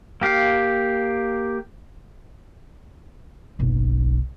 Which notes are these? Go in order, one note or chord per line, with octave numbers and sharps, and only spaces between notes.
A#3 G4 F5
F#1 B1